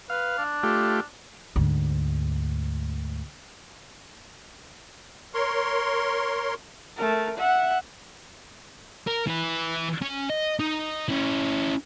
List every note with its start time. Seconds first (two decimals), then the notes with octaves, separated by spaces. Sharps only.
0.10 B4 F5
0.38 D4
0.63 A3 F4 G4
1.56 D2 G#2
5.34 A#4 C#5 C6
6.97 A3 A#4
7.37 E5 F#5
9.08 A#4
9.27 E3 E4
10.02 C#4
10.30 D#5
10.60 D#4
11.08 C#4 E4